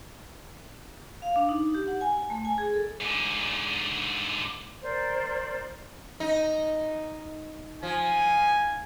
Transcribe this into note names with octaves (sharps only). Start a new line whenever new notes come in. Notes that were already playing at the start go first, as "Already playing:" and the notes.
F5
D4
D#4
G4
F#5
G#5
A3
G#5
G#4
A4
G#2 D3
A#4 C5 D5
D#4
F3 G#5